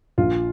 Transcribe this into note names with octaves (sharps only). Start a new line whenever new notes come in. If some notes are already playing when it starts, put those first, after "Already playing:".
A#1 F4